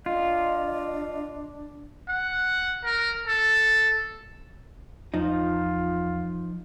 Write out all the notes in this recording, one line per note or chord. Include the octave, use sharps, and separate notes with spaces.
D4 F4 D#5
F#5
A#4
A4
E2 F3 D#4 F4